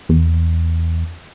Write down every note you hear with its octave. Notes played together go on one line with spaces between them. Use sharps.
E2